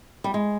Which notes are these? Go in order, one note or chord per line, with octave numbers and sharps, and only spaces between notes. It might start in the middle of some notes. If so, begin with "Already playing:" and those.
G3
G#3